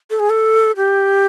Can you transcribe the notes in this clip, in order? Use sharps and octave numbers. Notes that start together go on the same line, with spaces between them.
A4
G#4
A4
G4